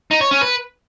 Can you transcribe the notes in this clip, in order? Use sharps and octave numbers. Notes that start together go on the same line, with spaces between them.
D#4
C#5
C#4
B4